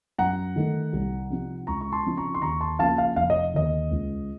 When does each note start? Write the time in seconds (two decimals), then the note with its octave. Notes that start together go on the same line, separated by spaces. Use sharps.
0.18 F#2 F#5 A#5
0.56 D#3 A3 D#4
0.93 C2
1.30 C3 F3 C4 D#4
1.67 C#2 A#5 C#6
1.81 C#6
1.92 A5 C6
2.05 C#3 F3 C4 D#4
2.17 A#5 C#6
2.34 C6
2.42 D#2 A#5 C#6
2.61 A5 C6
2.79 C#3 F3 A#3 F5 A5
2.98 F5
3.16 F1 F5
3.30 D#5
3.54 D#2 D#3 D#5
3.91 C#2